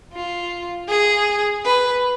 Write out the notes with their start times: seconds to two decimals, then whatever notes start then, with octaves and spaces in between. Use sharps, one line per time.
0.13 F4
0.88 G#4
1.64 B4